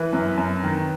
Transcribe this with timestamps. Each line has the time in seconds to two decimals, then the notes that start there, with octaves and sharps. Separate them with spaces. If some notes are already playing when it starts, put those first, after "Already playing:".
Already playing: E3 B4
0.13 F#2
0.38 F#2
0.63 D#3